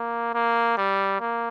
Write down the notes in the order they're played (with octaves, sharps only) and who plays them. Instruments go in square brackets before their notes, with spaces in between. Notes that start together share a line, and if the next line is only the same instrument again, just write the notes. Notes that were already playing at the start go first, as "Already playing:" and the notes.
Already playing: [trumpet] A#3
A#3
G3
A#3